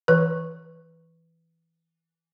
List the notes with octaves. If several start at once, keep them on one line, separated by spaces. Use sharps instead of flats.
E3 B4